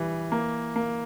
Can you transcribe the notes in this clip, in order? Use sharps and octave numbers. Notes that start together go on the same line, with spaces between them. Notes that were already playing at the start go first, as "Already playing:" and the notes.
Already playing: E3 G3
A#3
A#3